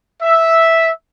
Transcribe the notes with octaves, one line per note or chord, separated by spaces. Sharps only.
E5